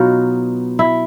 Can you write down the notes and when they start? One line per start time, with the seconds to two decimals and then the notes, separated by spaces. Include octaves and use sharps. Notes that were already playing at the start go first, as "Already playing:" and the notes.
Already playing: B2 F#3 B3 D#4 F4
0.79 E4